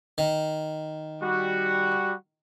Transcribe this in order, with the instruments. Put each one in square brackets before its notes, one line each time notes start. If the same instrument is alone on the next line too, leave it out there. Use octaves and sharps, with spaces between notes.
[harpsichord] D#3
[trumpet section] G3 F#4